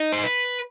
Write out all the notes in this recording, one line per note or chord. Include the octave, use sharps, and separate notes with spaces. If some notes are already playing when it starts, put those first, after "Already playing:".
Already playing: D#4
C5
B4